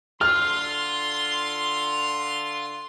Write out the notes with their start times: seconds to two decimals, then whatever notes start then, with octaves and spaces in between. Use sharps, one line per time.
0.21 D3 F4 C6 F6